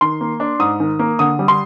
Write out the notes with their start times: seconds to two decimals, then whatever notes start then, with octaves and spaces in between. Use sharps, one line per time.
0.01 D#3 C6
0.21 A#3
0.40 D4
0.59 G#2 D#6
0.80 D#3
0.99 A#3
1.19 D3 D#6
1.39 G3
1.48 C6